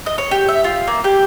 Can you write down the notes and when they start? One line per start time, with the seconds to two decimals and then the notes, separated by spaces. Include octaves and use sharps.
0.06 D#5
0.18 C#5
0.31 G4
0.49 E5
0.64 F4
0.88 A#3
1.04 G4